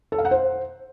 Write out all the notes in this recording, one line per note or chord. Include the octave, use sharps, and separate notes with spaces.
A4
F5
F#5
C5